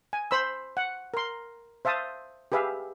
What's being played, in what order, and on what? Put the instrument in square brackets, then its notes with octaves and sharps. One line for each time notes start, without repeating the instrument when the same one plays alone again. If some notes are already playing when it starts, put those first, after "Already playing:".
[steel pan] G#5
C5 B5 E6
F#5
A#4 C6
C5 E5 F5 A5 D#6
G4 G#4 B4 E5 F5